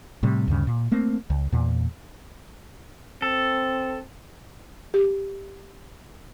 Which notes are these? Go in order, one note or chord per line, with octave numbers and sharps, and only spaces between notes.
A2 C3 G3
D2 G2 C#3
A#2
A3 A#3 C4
C#2
E2 A#2
C4 A4
G4